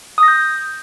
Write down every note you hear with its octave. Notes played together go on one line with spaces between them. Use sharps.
D#6
A#6
G6